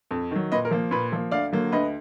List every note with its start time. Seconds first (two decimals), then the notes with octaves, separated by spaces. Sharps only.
0.11 F2
0.31 D#3 F#3
0.52 A#2 B4 D#5
0.65 A#4
0.71 F3 A#3
0.91 A#2 B4
1.12 F3 A#3
1.31 D2 D5 F5
1.53 D3 F#3 A#3
1.72 D2 B4 D#5